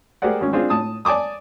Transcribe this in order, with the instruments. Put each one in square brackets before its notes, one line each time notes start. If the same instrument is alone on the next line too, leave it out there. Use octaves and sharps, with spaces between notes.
[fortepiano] G4 G#4 A#4 C5 D5 F#5
G#1 C#4
C4 D4 F4 G#4
A2 A5 D#6
D5 G#5 A5 D6 D#6